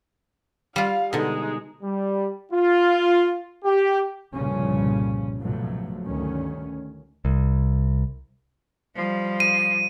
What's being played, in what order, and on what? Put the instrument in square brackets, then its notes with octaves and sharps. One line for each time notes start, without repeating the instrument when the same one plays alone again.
[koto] G3 F4 [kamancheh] F5
[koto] B2 D3 [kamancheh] G#3 D#4
[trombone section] G3
F4
G4
[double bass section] C2 G2 A#2 C#3 F3 C#4
C#2 G#2 B2 F3 F#3 A3
D2 G2 D#3 C#4
[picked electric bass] C2
[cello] F3 G3
[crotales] D#7